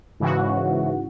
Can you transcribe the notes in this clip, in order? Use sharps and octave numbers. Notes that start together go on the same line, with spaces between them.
G#2 C#3 E3 F#4